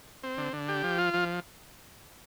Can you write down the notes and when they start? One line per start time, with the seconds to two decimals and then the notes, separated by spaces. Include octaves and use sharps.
0.23 C4
0.38 D3
0.53 D3
0.69 G4
0.83 F3
0.98 F4
1.14 F3